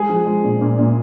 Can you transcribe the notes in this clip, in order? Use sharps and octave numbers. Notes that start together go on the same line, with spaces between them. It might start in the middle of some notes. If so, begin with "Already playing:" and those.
Already playing: G#3 G#4
F3
G#3
A#2
A#2
A#2